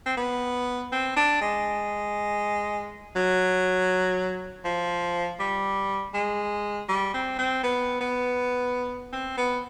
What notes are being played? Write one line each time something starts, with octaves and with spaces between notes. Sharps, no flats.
C4
B3
C4
D4
G#3
F#3
F3
G3
G#3
G3
C4
C4
B3
B3
C4
B3